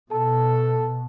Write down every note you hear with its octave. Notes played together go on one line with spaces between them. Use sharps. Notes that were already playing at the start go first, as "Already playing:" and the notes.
B2 A4 A5